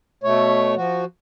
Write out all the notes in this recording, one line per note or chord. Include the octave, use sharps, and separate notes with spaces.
B2 A3 C#5
F3 F#4